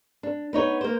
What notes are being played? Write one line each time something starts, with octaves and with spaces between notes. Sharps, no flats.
D4
B3 D#4 C#5
A#3 C5